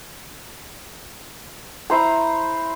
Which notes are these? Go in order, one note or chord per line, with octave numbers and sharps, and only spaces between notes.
E4 C5 A#5